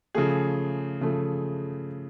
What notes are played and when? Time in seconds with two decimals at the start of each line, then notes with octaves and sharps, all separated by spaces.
0.15 C#3 F3 A3 G#4
1.01 C#3 F3 A3